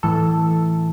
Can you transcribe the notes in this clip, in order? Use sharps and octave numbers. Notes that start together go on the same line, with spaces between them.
A2 E3 A4